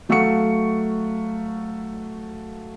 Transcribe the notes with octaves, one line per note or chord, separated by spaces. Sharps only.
F#3 A3 F5 F#5 C#6 C#7